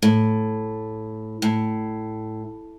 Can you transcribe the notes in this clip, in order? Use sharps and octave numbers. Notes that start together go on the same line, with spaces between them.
A2
A2